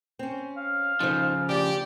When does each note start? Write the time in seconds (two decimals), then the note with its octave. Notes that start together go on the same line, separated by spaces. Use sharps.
0.19 C4 C#4
0.57 F5
1.00 C#3 F3 D#4 A4 C5
1.49 D2 G4 D5